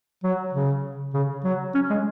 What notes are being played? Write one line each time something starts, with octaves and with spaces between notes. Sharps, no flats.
F#3
C#3
C#3
F#3
C#4
G#3